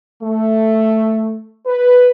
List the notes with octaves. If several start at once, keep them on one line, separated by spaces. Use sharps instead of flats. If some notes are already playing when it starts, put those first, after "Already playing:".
A3
B4